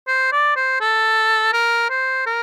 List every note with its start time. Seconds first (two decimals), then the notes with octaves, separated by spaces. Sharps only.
0.07 C5
0.32 D5
0.56 C5
0.81 A4
1.53 A#4
1.90 C5
2.26 A#4